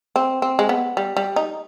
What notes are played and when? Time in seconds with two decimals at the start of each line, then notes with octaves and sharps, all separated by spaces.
0.16 C4
0.42 C4
0.59 G#3
0.69 B3
0.97 G3
1.17 G3
1.36 D#4